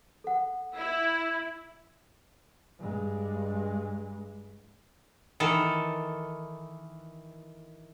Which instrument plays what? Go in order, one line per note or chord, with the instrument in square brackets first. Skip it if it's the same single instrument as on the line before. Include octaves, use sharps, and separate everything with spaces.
[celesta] A4 F#5
[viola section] E4
[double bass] G2 G#3
[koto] D#3 E3 A4